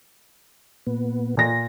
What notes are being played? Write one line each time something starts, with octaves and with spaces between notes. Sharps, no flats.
A#2 B3
A#2 A#6